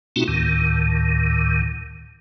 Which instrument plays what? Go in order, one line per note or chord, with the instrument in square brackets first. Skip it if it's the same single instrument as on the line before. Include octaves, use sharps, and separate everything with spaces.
[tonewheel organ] B2 A3 C4 D#4 F4 F#4
D2 A2 D#3